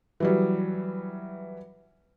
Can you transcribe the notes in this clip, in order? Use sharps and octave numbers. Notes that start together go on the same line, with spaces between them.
E3 F#3 G3